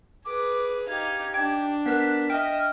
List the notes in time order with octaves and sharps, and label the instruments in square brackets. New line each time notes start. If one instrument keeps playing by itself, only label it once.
[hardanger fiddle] G#4 B4 [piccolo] D6
[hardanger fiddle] D#4 F5 [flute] G4 [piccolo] G#6
[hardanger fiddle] D4 [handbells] G5
[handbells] B3 A#4 [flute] F#6 [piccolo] B6
[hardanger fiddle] D#5 E5 [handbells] G5 [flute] F6